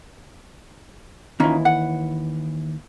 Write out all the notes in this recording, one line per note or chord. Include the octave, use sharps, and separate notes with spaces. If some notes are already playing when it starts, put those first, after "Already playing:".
D#2 E3 C#4 D#4 F4
F#5